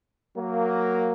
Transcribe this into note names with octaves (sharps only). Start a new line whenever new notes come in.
F#3 A#3